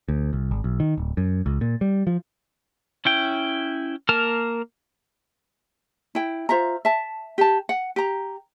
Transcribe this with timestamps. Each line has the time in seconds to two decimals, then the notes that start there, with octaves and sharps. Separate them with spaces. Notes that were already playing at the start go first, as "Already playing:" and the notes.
0.08 D2
0.33 C2
0.51 G#1
0.64 B1
0.80 D#3
0.98 D1
1.17 F#2
1.46 C#2
1.61 A#2
1.81 G3
2.07 F3
3.05 C#4 E4 G5
4.09 A#3 A#4 A5 F6
6.15 E4 G5
6.49 F4 C5 E5 A#5
6.85 E5 A5
7.38 G4 A5
7.69 F#5
7.96 G4 A#5